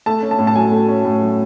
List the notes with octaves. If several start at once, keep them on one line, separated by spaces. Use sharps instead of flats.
A3 A5
C#4
A5
A2
A5
F#3 G#5
A3
C#4
A2
F#3